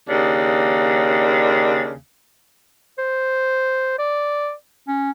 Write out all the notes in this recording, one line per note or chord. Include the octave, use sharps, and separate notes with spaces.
D#2 C#3 D4
C5
D5
C#4